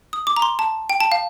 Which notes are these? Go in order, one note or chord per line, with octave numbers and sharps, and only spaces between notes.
D#6
D6
A#5
C6
A5
G5
A5
F5